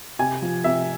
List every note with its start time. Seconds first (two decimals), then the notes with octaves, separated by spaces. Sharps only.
0.19 C3 G#5
0.42 F3
0.64 C3 E5